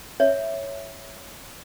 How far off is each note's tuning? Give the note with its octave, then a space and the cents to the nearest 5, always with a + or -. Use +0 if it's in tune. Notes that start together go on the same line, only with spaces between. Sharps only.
C#5 +0 E5 +0